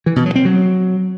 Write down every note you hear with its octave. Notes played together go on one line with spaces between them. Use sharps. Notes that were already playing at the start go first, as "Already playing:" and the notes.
E3
B2
F#3
C4
F#3